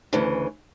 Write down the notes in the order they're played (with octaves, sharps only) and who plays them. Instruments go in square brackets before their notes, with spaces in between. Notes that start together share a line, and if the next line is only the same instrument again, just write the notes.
[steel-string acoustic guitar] D2 C#3 E3